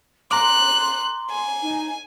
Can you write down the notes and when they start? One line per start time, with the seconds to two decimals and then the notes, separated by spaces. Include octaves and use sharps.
0.31 A#5 C6 D6 F#6
1.30 G#5
1.62 D#4